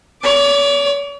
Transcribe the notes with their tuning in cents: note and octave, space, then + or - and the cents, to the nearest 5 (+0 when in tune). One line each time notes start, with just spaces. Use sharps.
C#5 +40 D6 +0